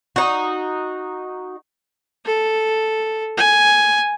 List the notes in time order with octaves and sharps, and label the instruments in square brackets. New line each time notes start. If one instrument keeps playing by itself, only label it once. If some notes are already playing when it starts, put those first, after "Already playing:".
[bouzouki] D#4 F#4
[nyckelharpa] A4
G#5